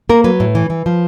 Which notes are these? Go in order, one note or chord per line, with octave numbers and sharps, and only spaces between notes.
A#3 A#4
F#3 B4
A2
E3
E3
F3